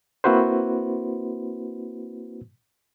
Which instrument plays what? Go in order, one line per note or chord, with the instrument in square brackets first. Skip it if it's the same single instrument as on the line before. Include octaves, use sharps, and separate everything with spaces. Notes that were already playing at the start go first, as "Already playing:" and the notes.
[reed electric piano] A#3 C4 E4 F#4 B4 C5